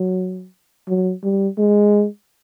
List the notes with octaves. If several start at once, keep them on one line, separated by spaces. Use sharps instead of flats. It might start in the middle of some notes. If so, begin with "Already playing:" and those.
Already playing: F#3
F#3
G3
G#3